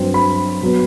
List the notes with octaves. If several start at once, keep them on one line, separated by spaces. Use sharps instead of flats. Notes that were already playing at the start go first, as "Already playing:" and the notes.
Already playing: G2 F#3 C4
B5
B2 F#3 B3